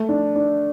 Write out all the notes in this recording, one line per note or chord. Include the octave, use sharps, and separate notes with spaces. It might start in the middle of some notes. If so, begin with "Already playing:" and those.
Already playing: A3
D4
D4